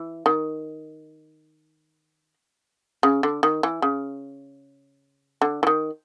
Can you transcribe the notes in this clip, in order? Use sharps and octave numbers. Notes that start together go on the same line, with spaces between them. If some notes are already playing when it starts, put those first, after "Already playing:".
Already playing: E3
D#3
C#3
D3
D#3
E3
C#3
D3
E3
D#3